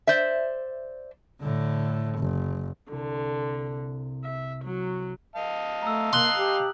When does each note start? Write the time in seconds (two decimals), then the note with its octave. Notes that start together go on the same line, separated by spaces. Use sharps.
0.07 C5 D5 E5
1.41 A2 D3
2.18 F#1
2.92 C2 D3
4.24 E5
4.64 F#3
5.36 D#5 F5 A5
5.83 A3 A#5 E6
6.13 A#3 C6 D#6 F#6 F#7
6.37 G4